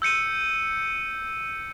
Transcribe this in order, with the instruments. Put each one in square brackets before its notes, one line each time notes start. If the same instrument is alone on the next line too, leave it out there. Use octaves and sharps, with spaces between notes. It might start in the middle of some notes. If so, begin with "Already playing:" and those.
[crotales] E6 G6 C#7 D#7